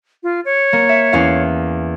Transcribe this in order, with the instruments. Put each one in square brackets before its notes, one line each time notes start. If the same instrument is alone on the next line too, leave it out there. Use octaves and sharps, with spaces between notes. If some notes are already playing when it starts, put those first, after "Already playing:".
[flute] F4
C#5
[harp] A#3
E5
E2 C#4 F5